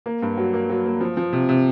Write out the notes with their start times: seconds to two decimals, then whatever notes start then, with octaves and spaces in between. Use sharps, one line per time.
0.06 A#3
0.22 G2
0.37 F#3
0.54 A#3
0.70 F#3
0.85 A#3
1.01 F3
1.17 F3
1.33 C3
1.49 C3